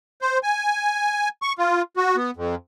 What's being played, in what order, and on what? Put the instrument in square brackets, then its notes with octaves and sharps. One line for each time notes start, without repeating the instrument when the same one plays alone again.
[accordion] C5
G#5
C#6
F4
F#4
B3
F2